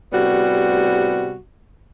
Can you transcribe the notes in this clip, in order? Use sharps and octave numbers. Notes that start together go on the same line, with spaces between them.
A2 C3 G3 B3 F#4